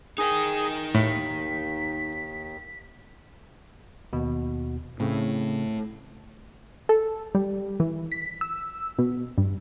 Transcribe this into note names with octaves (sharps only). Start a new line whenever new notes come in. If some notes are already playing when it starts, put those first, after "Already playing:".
D#4 G#4 A#4 G5 D#6
D#2 A2 B6
D#2 B2
A2 C#3 C4
A4
G3
E3
B6
E6
B2
G2